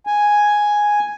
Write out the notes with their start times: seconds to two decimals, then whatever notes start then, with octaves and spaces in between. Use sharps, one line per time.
0.07 G#5